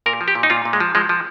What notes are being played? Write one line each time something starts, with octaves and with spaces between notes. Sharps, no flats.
A#2 A#4
F3
G4
A#2
D#4
A#2 F4
A#2
G#3
F3
F3 G#3
F3